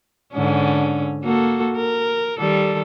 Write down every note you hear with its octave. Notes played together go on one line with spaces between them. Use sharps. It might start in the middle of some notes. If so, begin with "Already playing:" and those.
G#2 D3 C#4
A#3 F#4 A4
A#4
D#3 G3 A4